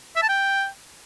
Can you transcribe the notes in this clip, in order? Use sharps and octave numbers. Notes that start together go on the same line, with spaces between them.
E5
A5
G5